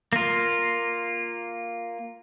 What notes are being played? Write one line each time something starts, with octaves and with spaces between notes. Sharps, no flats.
A#3 F4